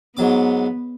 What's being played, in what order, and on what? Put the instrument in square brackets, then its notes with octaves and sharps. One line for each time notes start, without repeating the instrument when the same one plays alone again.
[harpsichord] G#2 F#3 D6 [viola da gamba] B3